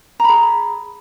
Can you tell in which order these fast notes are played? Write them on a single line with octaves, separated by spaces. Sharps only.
A#5 B5 G#4